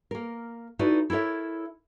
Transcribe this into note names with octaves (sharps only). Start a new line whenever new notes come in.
A#3 A#4
D#4 E4 F#4 A4 B4 D5
E4 A4 A#4 C#5 E5